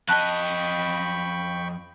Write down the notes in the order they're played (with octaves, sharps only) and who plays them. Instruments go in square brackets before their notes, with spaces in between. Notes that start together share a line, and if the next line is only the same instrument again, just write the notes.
[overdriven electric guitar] F2 D#5 [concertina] G5 B5 C#6 [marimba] A5 F#6